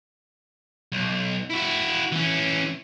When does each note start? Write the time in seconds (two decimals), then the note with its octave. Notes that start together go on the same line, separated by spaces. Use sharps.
0.92 B1
1.50 E4 F#4
2.12 E3 C#4